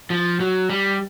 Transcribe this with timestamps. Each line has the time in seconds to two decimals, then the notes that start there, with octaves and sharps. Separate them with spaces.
0.10 F3
0.40 F#3
0.70 G3